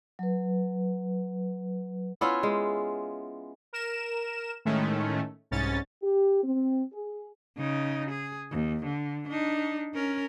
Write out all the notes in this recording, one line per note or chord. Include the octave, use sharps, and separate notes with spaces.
F#3 B4
B3 C#4 E4 F4
G#3
A#4 E7
A2 D#3 G#3 A3 C#4
C2 G#2 C#4 A6
G4
C4
G#4
C#3 D#4
G#4
D#2
D3
D4 D#4
C#4 A#4